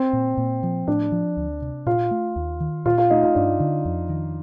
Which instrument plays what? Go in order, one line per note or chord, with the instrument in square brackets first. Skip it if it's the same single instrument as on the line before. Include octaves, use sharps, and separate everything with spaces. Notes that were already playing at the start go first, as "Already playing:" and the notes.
Already playing: [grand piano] C4 C5
[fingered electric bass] A#2
A#2
F3
[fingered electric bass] A2 [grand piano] D4 D5
[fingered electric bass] F3
D2
C3
[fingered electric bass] A#2 [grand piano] F4 F5
[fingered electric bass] A3
D#2
D#3
[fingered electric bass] A#2 [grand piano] F4 F5
[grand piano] F4 F5
[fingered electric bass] A3 [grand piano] D#4 D#5
[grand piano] F4 F5
[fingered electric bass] G2 [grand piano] D4 D5
[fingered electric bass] D3
F2
D#3